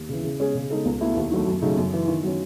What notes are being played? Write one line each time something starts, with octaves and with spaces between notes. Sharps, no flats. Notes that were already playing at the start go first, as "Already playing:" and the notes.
Already playing: D#2
C#3 E3
C#3
G#3 C#4 G#4
C#3
G#3 D#4 A4
C#2
B2 A3 E4
D#2
D#3 F#3 A3
F#2
C#3 F#3 A3 D#4
F#2
E3 B3
D#3
F#3 C#4